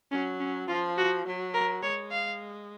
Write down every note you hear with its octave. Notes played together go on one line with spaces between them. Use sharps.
F#3 C#4
C#4
F3 F4
F#4
F#3
A#4
G#3 C#5
F5